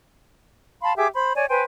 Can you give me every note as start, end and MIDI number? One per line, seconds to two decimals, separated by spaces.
0.82 0.94 77
0.82 0.94 81
0.82 0.94 83
0.82 0.94 84
0.97 1.07 67
0.97 1.07 68
0.97 1.07 76
0.97 1.07 86
1.14 1.32 72
1.14 1.32 83
1.35 1.45 73
1.35 1.45 74
1.35 1.45 80
1.49 1.63 71
1.49 1.63 72
1.49 1.63 79
1.49 1.63 80